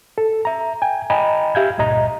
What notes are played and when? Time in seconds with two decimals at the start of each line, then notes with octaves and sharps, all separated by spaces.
0.18 A4
0.45 E5 A#5
0.82 G5 G#5
1.10 D#5 G5 G#5 A#5 B5
1.55 G4 E5 F5 G6 G#6
1.78 C#2 G2 A#2 D#5 A#5